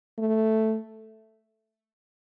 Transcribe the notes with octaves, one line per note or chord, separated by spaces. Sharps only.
A3